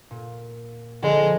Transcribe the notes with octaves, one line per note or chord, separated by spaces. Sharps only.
A#2
D3 F3 G#3 E4